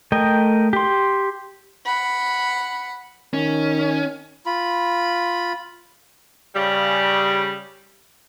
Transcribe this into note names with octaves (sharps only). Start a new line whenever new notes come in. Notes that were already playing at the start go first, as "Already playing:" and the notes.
A3 A#4 D#5 G5
G4 C6
F#5 B5
D#3 C#4
F4 B5
C#3 G3